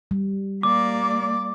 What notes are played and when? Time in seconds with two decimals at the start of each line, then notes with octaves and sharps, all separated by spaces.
0.11 G3
0.63 A#3 D5 D6